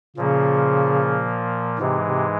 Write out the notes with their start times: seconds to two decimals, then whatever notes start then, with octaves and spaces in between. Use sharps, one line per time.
0.16 A#2 C#3 F3 A#3
1.79 G#2 C3 E3 G#3
2.06 C3